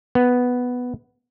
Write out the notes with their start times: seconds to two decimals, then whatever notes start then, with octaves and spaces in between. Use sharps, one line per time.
0.15 B3